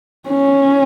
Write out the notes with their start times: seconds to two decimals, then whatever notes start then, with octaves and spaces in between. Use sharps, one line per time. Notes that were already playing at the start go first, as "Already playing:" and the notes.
0.29 C#4